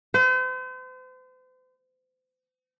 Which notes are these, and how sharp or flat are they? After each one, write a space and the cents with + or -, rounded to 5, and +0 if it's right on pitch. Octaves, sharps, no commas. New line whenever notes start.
C5 -40